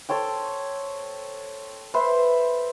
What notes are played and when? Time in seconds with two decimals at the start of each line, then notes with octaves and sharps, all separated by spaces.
0.09 A4 C5 C#5 G5
1.94 B4 C5 E5 C6